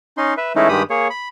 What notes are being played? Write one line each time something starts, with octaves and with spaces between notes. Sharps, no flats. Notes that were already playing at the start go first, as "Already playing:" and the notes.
C#4 D#4 C6
B4 E5
E3 G#3 A3 C#4 D#4 E4
G2 D#3 G#3 G4 B5 D#6
A#3 G#4 C#5
B5